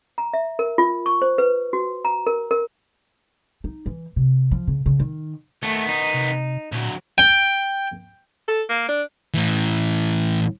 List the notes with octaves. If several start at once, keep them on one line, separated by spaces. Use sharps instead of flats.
A#5
E5
A#4
F4
C#6
C5
B4
F#4
A#5
A#4
A#4
D#4
E3
C3
F3
C#3
C#3
D#3
D#3 A3 B3
D#4
C3
D2 A#2 F#3
G5
A4
A#3
D4
A2 E3